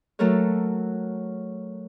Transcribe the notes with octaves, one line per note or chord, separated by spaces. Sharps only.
F#3 A3 A4 A#4 C#5